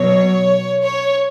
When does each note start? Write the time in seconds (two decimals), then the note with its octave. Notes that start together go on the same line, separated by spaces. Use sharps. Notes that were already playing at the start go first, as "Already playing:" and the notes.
Already playing: B2 F#3 C#5
0.82 C#5